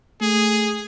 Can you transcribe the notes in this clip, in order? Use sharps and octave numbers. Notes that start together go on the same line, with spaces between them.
A3 G#4